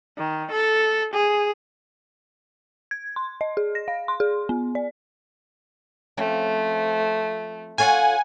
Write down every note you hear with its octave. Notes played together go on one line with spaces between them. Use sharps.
D#3
A4
G#4
G#6
C6
D#5
G#4
A#6
F5
C6
G#4
B3
D5
F3 A3 C4 C#4
F4 A4 C#5 F#5 G#5